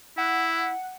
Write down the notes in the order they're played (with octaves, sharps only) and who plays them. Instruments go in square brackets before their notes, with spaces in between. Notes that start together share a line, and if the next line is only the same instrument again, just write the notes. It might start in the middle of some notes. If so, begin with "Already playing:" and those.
[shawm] E4 [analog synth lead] F#5